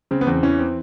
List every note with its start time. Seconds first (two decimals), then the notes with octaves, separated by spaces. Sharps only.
0.11 C#3 C4
0.21 B3
0.27 E2 C4
0.43 E3 C#4
0.59 C4